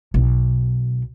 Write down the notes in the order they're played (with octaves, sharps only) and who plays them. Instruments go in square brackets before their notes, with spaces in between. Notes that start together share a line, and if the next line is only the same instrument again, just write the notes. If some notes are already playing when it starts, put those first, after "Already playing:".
[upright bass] B1